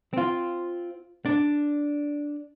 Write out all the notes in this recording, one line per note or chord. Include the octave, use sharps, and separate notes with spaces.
C4 F4
D4